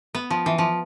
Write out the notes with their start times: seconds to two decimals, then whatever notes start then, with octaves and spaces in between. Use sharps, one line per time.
0.15 B3
0.30 F3
0.46 E3
0.58 F3